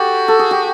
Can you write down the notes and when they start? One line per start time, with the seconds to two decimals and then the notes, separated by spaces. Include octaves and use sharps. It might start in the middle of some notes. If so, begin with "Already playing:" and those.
Already playing: F#4 G4 A4
0.28 A4
0.39 G#4
0.51 G4